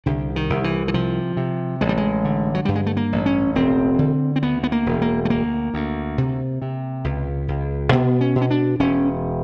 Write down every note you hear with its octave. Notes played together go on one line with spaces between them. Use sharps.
C2 D3
D#3
C2
E3
E3
C3 F3
C3
A1 G#3
G3
G#3
D3
F#3
G2 G3
G#3
A3
A#3
A1
C#4
E1 C4
D3
C4
D2 B3
B3
A#3
E1
A#3
A3
D2 A#3
D2
C3
C3
C#2
C#2
B2 B3
C#4
B2
C#4
D4
E1 C#4